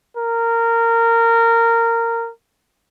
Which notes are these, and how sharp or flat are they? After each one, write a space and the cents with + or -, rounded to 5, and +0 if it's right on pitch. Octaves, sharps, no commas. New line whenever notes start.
A#4 -15